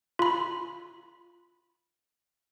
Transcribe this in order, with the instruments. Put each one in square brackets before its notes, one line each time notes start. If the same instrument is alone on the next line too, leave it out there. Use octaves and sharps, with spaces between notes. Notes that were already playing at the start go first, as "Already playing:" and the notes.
[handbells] F4 B5